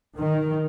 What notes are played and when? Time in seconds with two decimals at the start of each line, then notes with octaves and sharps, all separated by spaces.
0.16 D#3